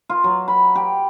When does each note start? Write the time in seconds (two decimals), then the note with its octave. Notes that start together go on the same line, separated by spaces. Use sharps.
0.09 F4
0.24 F#3
0.48 B5
0.75 G4